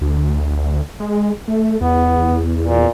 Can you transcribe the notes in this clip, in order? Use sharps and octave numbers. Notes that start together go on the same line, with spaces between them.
D2
G#3
A3
E2 B3
A#2